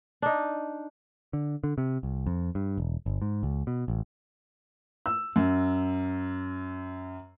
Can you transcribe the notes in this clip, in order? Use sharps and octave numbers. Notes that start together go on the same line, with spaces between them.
D4 D#4
D3
D3
C3
C2
F2
G2
E1
G1
G#2
C#2
B2
A1
E6
F#2